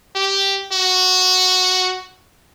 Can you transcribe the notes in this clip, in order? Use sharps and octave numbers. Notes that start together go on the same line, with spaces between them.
G4
F#4